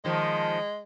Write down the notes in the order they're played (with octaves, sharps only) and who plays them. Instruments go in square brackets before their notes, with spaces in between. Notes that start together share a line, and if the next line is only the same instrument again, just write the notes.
[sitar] D#3 F3 [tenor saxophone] G#3